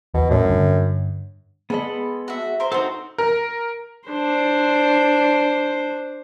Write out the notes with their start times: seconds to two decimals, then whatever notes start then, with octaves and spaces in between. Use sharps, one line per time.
0.14 E2 B2
0.31 F#2 A2
0.45 G2 D3
1.70 G#3 B3 A4 D#5 B5
2.28 F#4 E5
2.60 A#4 C5
2.72 C4 D#4 F#4 A4 C5
3.18 A#4
4.09 D4 C5